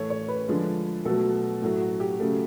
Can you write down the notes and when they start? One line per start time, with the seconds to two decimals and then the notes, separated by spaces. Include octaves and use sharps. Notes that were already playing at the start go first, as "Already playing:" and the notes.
Already playing: A2 E3 A3 C#5
0.10 C#5
0.28 B4
0.48 D3 F3 G#3
1.05 B2 F#3 A3 A4
1.62 A2 F#3 A3
1.82 F#4
2.00 G4
2.20 C#3 F#3 A3